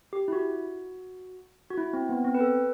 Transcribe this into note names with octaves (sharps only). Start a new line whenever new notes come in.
G4
E4
F#4
F#4
E4
C4
B3
C4
B4
A4